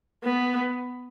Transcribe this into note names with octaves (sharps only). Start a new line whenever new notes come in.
B3